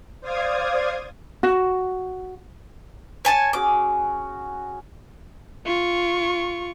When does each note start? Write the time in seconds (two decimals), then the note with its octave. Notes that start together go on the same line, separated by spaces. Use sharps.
0.21 C5 D5 F5 D#6 G#6
1.43 F#4
3.25 C#5 G#5 A5
3.53 C#4 F#4 G#4 D6
5.65 F4 C#6